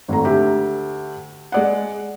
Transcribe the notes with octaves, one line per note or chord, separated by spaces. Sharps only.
G#1 A3 A#5
D2 G4 E5
G#3 D5 F#5